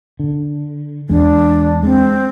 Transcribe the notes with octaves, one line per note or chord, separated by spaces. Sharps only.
D3
E2 G#3 D4
G#3 C4